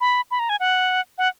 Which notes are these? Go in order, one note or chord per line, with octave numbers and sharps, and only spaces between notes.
B5
B5
A#5
G#5
F#5
F#5